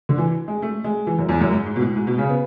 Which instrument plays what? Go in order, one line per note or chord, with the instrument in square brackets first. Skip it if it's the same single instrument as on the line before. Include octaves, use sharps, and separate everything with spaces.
[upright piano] D3
E3
G#3
A3
G#3
E3
F#2
E2
F#2
G#2
G#2
B2
A2
G#2
B2
C#3
B3